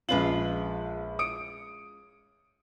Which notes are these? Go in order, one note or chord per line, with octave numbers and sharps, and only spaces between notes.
A#1 G#3 C#4 F4 B4 F#7
D#6 C#7 D7